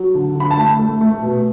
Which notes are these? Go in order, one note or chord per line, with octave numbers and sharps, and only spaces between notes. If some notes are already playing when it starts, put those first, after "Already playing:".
Already playing: F#3
D3
D3 B5
A5
A3
A3
A3
B2